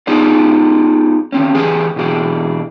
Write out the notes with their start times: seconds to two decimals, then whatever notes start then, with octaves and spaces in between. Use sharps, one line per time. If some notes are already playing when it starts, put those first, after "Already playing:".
0.07 B3 D#4 F4 G4 G#4 D5
1.32 D#3 C4 C#4
1.55 A2 E3 G4 G#4 G#5
1.96 B2 E3 G4 G#4